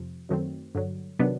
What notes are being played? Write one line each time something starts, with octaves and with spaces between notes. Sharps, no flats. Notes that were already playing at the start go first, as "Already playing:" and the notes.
Already playing: F2 C3 F3
F#2 D#3 F#3 A3 C4
G2 D3 F#3
C3 D#3 F#3 B3 D4